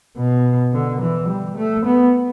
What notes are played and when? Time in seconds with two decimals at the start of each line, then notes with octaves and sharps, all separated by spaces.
0.17 B2
0.73 D3
1.01 E3
1.29 G3
1.57 A3
1.86 B3